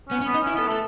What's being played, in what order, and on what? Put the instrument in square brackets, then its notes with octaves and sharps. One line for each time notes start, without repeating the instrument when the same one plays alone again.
[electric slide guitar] B3 [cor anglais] C#4
[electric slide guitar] C#4
[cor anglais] B3
[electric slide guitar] D#4
[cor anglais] C#4 [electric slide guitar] E4
[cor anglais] B3 [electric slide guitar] A4
[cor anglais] A3 [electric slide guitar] A4